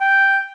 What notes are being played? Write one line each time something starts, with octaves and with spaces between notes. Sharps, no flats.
G5